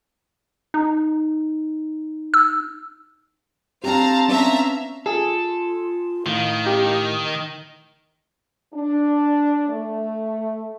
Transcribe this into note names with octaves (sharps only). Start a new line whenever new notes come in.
D#4
E6
C4 D4 G4 F5 A5 A#5
B3 C#4 D4 E5 F5 A#5
F4 G#4 A4
A2 D#3 F5
G4
D4
A3